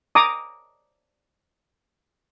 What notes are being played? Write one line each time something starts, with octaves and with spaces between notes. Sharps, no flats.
A#5 D6 D#6